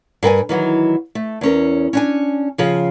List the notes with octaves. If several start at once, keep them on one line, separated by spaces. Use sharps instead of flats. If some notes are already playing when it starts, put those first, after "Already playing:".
G2 A#4 G5 G#5
D#3 E3 F#3
A3
E2 C#4 A#4
C#4 D4 G#5
C#3 F3 G#4